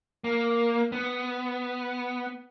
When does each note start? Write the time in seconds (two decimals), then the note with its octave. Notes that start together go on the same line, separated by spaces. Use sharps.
0.24 A#3
0.92 B3